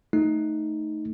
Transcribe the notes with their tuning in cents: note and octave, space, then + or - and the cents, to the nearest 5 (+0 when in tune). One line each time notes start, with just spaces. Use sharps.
A3 +0 D#4 +0